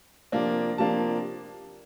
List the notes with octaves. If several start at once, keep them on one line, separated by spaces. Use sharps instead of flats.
C3 F3 A#3 D4
C3 F3 A#3 D4 A5